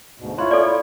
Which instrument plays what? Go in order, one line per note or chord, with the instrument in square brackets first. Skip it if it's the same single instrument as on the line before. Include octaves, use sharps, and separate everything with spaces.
[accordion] D2 G#2 B2
[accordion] E4 F4 C#5 [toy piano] C6
[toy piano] A4 D5